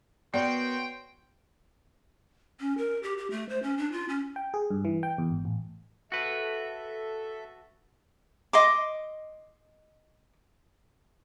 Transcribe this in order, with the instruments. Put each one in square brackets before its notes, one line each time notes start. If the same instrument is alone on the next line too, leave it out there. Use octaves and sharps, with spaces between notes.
[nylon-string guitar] B3 A#4 [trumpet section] F#4 C#5 C6 [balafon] D5 [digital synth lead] G5
[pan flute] C#4
A#4
G4
G4
A3
C5
C#4
D4
F4
C#4
[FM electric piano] G5
G#4
G2
E3
G5
E2
G#1
A1
[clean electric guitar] F#4 B4 [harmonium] A4 E5
[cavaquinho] D#5 C6 D6